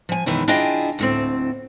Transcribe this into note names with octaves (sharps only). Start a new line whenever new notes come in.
F3 G#5
F#2 B2 D#3 E3 G#3
D4 E4 F4 G#4 D#5 G5
D2 A2 C4